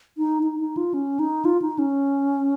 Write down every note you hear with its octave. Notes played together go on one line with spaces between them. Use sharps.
D#4
D#4
D#4
F4
C#4
D#4
F4
D#4
C#4